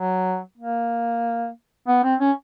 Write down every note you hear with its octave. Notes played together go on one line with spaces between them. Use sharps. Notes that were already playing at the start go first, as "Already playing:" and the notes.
Already playing: F#3
A#3
B3
C4
C#4